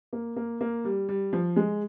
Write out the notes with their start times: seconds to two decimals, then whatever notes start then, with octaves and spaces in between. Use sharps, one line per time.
0.13 A#3
0.36 A#3
0.61 A#3
0.85 G3
1.09 G3
1.33 F3
1.56 G#3